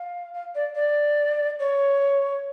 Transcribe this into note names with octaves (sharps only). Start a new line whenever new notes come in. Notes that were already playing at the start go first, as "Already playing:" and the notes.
Already playing: F5
F5
D5
D5
C#5